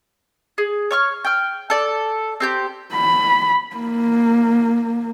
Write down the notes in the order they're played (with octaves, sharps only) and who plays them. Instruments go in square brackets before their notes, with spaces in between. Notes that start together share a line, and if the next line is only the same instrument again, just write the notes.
[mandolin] G#4
C#5 C#6 F6
G5 F6
A4 D5
C4 G4 G6
[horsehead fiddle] B5
A#3